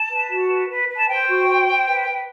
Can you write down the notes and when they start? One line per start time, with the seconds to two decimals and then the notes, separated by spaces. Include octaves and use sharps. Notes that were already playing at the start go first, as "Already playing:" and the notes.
Already playing: A5
0.10 B4
0.29 F#4
0.49 B4
0.69 B4
0.89 B4
0.97 A5
1.09 C5 G5
1.29 F#4
1.48 C5
1.67 C5
1.87 B4
2.08 B4